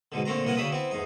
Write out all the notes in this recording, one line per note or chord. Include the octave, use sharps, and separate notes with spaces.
G#2 B2 D3
A#2 D3 A3 C4 A#5
C2 A#2 E3 A#4 F#5 G#5
D2 C#3 D4 E5 B5 D#6
B3 C4 E4
E2 G#2 D#4